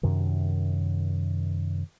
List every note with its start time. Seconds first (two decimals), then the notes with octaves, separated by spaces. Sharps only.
0.03 F#2 C3 D#3